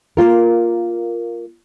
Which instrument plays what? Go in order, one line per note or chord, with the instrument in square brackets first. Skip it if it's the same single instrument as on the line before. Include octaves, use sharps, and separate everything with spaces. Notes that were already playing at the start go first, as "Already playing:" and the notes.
[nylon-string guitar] A#3 F4 A#4